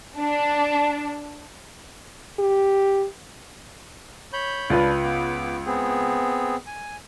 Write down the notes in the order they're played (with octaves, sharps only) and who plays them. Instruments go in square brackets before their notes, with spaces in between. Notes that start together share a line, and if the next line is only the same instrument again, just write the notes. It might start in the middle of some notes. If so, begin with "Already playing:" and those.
[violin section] D4
[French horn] G4
[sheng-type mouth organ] C#5 B5 G6
[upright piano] C#2 F4 B4 [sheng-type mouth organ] D4 D5
[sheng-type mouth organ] B3 D6
B3 C4 G#4
G#5